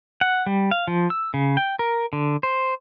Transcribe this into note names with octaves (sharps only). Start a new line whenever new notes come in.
F#5
G3
F5
F3
E6
C#3
G5
A#4
D3
C5